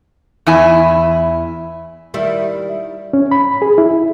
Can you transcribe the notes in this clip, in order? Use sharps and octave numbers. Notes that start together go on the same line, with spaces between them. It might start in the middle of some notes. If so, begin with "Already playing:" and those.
E2 E4 G#5
D#3 G3 E4
C#4
B5
G#4
E4